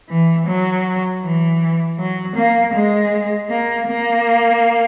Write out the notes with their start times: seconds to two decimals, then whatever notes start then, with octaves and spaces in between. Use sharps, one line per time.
0.09 E3
0.47 F#3
1.23 E3
1.99 F#3
2.36 A#3
2.74 G#3
3.50 A#3
3.88 A#3